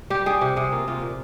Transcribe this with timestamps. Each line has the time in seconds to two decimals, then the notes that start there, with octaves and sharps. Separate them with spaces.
0.10 G3 G4
0.26 G3 G#4
0.41 C3 G4
0.56 C3 G#4
0.72 A#3 F4
0.87 C3 F4
1.02 A#2